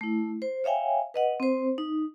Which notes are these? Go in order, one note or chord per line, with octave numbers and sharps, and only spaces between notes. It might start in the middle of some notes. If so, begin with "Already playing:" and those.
A3 E4
C5
C#5 E5 F5 G5 G#5
B4 D#5 F#5
C4 C5
D#4